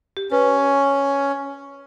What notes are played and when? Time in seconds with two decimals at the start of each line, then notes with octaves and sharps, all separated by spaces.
0.17 G4
0.32 C#4 B4